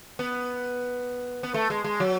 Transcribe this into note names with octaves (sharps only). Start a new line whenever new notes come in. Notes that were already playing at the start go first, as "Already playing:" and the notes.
B3
B3
A3
G#3
G#3
F#3